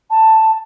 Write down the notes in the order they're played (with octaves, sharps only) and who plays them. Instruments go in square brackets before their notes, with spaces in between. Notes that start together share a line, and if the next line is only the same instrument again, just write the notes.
[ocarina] A5